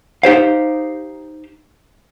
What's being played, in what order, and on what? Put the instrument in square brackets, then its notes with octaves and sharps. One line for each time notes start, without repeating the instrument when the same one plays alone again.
[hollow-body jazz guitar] D#4 G4 C5 F5